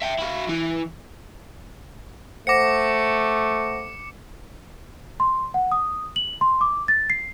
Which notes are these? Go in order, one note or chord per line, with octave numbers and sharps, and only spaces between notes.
E5 G5
E4 F#4
E3 E4
A3 C5 F#5 D6 A#6 C#7
C6
F#5
D#6
F#7
C6
D6
A6
C7